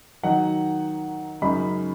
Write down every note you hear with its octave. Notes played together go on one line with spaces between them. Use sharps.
D#3 F#3 D#4 F#5
F#2 C#3 G#3 D#4 B5